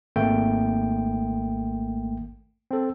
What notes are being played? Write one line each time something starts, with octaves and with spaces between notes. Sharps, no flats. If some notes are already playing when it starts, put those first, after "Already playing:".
G#1 A3 A#3 G5
C4 A4